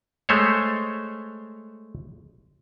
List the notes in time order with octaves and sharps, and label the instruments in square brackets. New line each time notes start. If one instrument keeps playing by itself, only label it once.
[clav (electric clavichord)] G#3 A3 C5 C#5